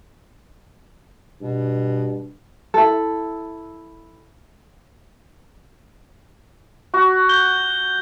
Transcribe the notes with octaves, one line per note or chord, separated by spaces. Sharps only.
G2 B2
E4 A4
F#4
G6 G7